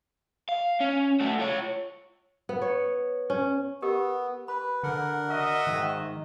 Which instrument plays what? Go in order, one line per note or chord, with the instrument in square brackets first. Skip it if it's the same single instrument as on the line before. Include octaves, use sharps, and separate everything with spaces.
[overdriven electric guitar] F5
C#4
A3 F#4
F4 C#5
[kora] B3
C#5
C#4
[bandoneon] B3 [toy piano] G4 A#4 D#5
[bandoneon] B4 [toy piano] B5
[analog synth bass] D3 [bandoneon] A#4 F#5
[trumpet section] F#4 D#5 E5
[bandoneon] G#2 [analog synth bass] D#3